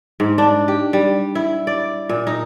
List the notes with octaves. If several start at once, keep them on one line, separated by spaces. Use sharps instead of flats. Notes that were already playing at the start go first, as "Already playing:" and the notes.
G#2
D4
G4
G3
E4
D5
A#2
D#4